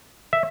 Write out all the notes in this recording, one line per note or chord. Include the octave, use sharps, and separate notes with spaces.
E5